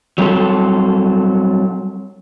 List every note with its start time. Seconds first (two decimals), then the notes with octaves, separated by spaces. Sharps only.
0.18 F#3 G3 C4 A4